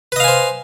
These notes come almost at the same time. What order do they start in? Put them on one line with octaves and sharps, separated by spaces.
B4 D#5 F5 G#5 C5